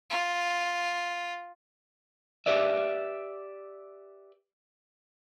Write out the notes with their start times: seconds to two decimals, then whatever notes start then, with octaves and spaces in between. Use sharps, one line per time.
0.10 F4
2.46 G4 B4 D5 E5